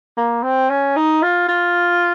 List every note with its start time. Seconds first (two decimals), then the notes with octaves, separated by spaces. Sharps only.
0.17 A#3
0.43 C4
0.70 C#4
0.96 D#4
1.22 F4
1.48 F4